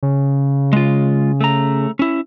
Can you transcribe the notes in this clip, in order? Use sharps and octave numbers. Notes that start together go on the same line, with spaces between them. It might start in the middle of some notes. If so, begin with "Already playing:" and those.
C#3
G#3 F4
A3 A#5
C#4 E4